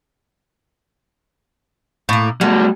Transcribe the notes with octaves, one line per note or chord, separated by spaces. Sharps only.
A2 A#3
F#3 G3 A3